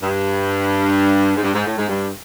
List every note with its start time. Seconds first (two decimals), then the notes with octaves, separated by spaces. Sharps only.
0.03 G2
1.37 G#2
1.43 G2
1.55 G#2
1.67 A2
1.78 G#2
1.89 G2